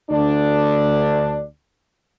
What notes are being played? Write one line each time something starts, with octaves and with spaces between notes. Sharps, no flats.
D2 D4